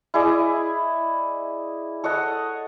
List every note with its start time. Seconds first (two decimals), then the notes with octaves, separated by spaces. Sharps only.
0.14 E4 G#4 D5 D#5
2.04 A4 C#5 D#5 F#5